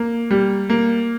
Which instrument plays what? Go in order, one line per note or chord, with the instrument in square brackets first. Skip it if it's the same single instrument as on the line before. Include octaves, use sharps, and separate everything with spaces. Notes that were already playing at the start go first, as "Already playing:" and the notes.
Already playing: [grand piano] A#3
G3
A#3